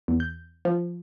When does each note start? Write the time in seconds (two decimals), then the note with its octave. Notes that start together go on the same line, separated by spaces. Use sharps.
0.08 E2
0.20 G6
0.65 F3